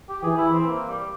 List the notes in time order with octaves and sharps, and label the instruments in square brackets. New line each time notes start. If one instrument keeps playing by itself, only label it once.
[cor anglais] G4
[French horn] E3 [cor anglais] G#4
[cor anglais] E4
C4
A#3
G3